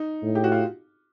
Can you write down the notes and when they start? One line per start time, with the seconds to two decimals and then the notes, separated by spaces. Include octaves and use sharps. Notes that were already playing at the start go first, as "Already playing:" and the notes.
Already playing: D#4
0.23 A2
0.35 G4
0.44 F#4
0.52 F4